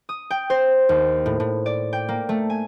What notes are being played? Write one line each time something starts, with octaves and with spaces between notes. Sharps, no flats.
D#6
G5
C5
D#2
A2
A2
D5
G5
A#3
A3
G#5